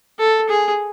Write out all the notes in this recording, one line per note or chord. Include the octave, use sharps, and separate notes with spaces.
A4
G#4